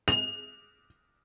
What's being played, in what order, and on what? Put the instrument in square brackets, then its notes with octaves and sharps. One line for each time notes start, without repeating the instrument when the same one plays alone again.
[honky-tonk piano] F7